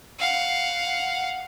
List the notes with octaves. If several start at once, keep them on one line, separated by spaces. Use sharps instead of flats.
F5 F#5